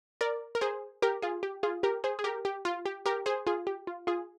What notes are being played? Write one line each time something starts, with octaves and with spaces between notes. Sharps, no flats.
A#4 D5
A#4
G#4 C5
G4 A#4
F4 G#4
G4
F4 G#4
G4 A#4
G#4 C5
G#4
G4 A#4
G4
F4
G4
G4 A#4
G#4 C5
F4 G#4
G4
F4
F4 G#4